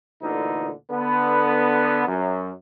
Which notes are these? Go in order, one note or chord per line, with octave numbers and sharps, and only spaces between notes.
D2 A#2 D3 E3 D#4
D3 B3
F#2